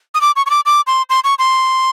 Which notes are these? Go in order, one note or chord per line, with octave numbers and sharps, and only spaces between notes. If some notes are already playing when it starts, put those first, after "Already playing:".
D#6
D6
C#6
C#6
D6
D6
C6
C6
C#6
C6